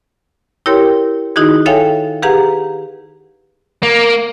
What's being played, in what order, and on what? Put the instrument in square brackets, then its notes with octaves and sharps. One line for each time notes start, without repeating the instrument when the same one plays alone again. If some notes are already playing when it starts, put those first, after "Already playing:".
[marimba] E4 G4 A#4 C#5 G5 C6
D#3 D#4 E4 F#4 G#4
A4 C#5 E5 F5 G5 G#5
G4 G#4 B4 F5 F#5 A#5
[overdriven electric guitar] A#3